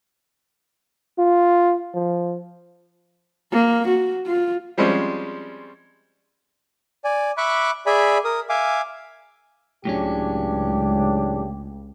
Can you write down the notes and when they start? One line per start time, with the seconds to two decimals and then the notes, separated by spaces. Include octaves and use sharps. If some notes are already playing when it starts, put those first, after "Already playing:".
1.19 F4
1.95 F3
3.52 A#3
3.88 F#4
4.26 F4
4.77 F3 G3 G#3 C4 C#4
7.04 D5 G#5
7.37 E5 B5 C#6 D6 F#6
7.86 G#4 D5 E5 G#5 B5
8.24 A#4 D#6
8.49 E5 F5 G#5 D6
9.85 C#2 A2 C#3 F#3 C#4 D4 G4